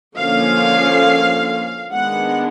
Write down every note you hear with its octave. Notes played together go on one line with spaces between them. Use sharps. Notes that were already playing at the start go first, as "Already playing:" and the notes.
D3 F3 A#3 C#4 F5
D#3 G#3 B3 D4 F#5